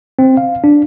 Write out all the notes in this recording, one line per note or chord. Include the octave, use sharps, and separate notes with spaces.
C4
F5
D4